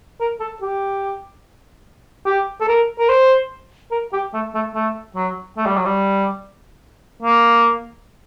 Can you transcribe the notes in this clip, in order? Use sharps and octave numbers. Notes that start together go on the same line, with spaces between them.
A#4
A4
G4
G4
A4
A#4
A#4
C5
A#4
G4
A3
A3
A3
F#3
A3
G3
F#3
G3
A#3